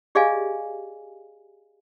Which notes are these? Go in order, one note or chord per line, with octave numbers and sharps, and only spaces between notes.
G4 G#4 D5 D#5 F5 G#5